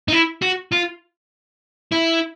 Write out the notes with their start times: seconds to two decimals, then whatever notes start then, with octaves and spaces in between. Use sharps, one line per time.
0.08 D#4
0.12 E4
0.42 F#4
0.72 F4
1.92 E4